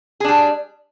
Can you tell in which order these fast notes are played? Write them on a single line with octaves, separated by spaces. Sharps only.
G#4 D4 G3